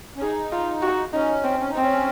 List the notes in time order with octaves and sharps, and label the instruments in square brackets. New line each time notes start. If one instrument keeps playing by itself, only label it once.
[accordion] C#4
[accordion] D#4 [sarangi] G#4
[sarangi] F4
F#4
[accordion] C#4 [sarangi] D#4
[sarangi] C4
[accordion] C#4
D#4
[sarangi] C4
[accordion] C#4